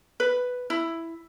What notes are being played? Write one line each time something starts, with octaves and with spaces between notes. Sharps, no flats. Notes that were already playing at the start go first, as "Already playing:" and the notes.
B4
E4